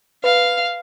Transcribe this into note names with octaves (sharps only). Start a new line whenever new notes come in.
B4 F5